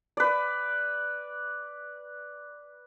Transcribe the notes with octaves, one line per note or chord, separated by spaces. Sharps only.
B4 D5